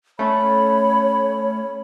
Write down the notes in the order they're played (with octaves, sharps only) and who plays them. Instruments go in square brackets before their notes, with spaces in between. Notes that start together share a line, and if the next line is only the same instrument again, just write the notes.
[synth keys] A3 C#4 [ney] C#5 [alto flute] B5